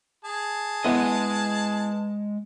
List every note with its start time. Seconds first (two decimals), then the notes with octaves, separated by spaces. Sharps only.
0.25 G#4 A5
0.84 G#3 B3 E4 D#5